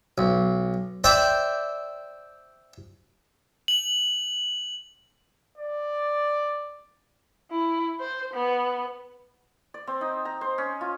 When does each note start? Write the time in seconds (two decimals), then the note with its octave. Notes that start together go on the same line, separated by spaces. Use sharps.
0.18 B1
1.04 C5 D5 E5 G5 D6
3.68 F#7
5.58 D5
7.52 E4
8.00 C5
8.34 B3
9.74 D5
9.87 C4
10.01 D#4
10.25 A#5
10.41 C5
10.58 C#4
10.81 F4